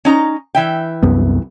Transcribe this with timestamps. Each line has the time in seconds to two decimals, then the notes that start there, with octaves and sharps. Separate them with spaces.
0.05 C#4 D#4 A#5
0.55 E3 E5 G5
1.03 C2 F#2 B3